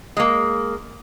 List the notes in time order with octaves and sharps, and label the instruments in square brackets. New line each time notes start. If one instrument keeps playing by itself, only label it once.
[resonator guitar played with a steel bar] G#3 A#3